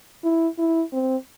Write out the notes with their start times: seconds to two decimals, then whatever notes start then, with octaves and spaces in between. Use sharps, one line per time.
0.24 E4
0.58 E4
0.93 C4